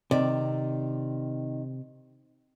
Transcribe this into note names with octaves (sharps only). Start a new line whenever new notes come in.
C3 D#3 D5